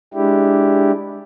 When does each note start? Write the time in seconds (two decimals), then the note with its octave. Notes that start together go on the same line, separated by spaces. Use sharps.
0.14 G#3 D4 E4 G4